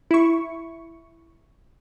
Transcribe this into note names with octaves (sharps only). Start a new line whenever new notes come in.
E4 C#6